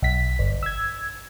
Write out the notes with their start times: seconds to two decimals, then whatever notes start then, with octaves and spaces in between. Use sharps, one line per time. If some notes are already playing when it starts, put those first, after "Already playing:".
0.02 B1 B6
0.39 G1
0.63 E6 G#6